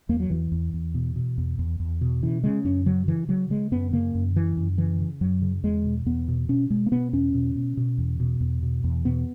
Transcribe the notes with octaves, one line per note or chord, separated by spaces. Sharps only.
E2 A#3
F#3
E2 E3
E2
E2
B2
B2
E2
E2
E2
B2
C#3 E3
C#3 G#3
F#2 C#4
C#3 F#3
C#3 E3
C#3 F#3
C#3 G#3
F#2 B3
C#3 A#3
F#2
C#3 E3
F#2
C#3 E3
C#3
F#2 F#3
C#3
E2 G#3
B2
E2 B3
B2
B2 C#4
B2 G#3
A#3
B2 B3
E2 C#4
B2
B2
B2
E2
B2
E2
B2
E2
B2 B3